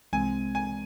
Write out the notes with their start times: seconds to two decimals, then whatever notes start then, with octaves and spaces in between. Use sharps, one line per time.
0.13 C2 C3 E3 G#3 C4 G#5
0.55 G#5